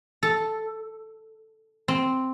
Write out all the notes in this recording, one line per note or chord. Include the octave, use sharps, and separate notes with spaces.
A4
C4